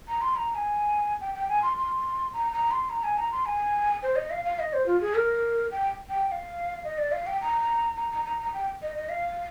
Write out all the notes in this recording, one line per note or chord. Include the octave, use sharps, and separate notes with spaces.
A#5
C6
A#5
A#5
G#5
G5
G5
G#5
C6
C6
A#5
A#5
C6
A#5
G#5
A#5
C6
G#5
C5
D#5
F5
F5
D#5
C5
F4
G#4
A#4
G5
G5
G5
F5
D#5
D5
F5
G5
A#5
A#5
A#5
A#5
A#5
G5
D#5
D#5
F5